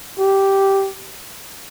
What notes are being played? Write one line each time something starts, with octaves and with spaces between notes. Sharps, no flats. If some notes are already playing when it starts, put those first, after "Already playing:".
G4